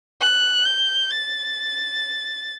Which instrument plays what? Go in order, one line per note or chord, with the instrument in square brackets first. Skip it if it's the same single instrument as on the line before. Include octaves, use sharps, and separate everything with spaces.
[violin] F#6
G6
A6